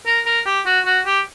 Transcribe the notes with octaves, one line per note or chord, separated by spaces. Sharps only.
A#4
A#4
G4
F#4
F#4
G4